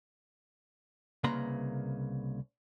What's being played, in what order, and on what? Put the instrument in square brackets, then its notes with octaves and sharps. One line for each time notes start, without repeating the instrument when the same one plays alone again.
[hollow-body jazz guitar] C2 C#3 A#3 B4 A#5 C6